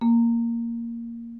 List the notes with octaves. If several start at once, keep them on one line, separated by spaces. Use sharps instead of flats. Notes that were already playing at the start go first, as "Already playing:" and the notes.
A#3